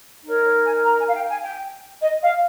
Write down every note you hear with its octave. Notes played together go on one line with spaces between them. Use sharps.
D#4 A#4 C#5
C#5
G#5
A#5
G#5
F5
G5
G#5
G5
D#5
F5